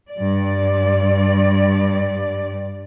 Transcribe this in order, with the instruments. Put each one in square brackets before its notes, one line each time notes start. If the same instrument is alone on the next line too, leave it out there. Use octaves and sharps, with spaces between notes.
[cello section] G2 D5